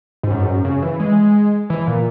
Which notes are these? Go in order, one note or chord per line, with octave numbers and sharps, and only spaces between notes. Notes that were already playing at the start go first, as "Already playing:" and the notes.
G#2
F#2
G#2
F#2
C#3
E3
G#3
E3
A#2